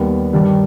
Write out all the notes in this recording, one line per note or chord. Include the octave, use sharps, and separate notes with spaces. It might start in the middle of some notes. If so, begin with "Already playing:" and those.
Already playing: D#2 D#3 G3 B3
G2 D#3 G3